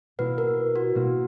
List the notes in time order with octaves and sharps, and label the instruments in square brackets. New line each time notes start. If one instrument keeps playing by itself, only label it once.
[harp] B2 A#3 E4 [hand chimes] B4
[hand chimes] A#4
F#4
[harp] B2 A#3 E4